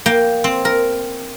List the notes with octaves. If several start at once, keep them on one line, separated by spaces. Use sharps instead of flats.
A#3 G5
C4
A#4